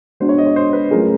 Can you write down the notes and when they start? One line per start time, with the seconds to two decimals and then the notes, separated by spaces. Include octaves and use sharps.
0.20 G#3 B3 D4 F#4 C5
0.29 C#5
0.38 D#5
0.46 C#5
0.56 C5
0.73 B4
0.91 F#3 A3 C#4 F4 G#4 A#4